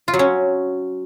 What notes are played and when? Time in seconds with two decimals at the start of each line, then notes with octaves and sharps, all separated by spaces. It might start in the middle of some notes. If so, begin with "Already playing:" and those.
0.08 F4
0.14 F#3
0.19 C#4